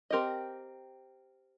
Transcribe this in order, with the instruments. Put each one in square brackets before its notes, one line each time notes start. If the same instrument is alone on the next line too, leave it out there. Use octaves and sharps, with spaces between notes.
[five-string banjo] C4 G4 A#4 D#5